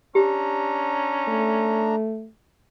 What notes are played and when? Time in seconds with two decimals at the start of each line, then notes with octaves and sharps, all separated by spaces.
0.15 C#4 D4 G4 A#5
1.29 A3